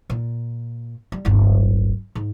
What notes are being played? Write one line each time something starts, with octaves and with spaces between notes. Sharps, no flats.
A#2
G3
D1 G1
G#2